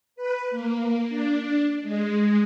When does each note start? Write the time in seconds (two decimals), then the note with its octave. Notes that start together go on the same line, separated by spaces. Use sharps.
0.16 B4
0.51 A#3
1.09 D4
1.82 G#3